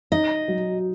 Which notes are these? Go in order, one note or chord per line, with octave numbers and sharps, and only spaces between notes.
D#4 D#5
F#3